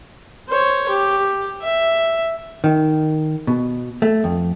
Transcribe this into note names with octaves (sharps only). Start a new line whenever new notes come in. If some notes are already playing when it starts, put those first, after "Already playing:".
C5 C#5
G4
E5
D#3
B2
A3
F2